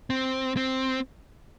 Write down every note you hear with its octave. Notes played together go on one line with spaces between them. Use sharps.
C4
C4